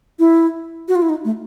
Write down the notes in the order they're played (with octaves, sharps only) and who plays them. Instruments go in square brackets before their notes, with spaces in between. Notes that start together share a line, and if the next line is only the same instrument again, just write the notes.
[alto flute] E4
F#4
F4
E4
D#4
A3